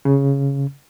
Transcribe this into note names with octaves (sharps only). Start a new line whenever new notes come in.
C#3